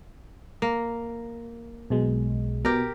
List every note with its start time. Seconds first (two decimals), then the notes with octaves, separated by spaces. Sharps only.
0.62 A#3
1.90 B1 B2 G#3
2.65 B2 G4 A#4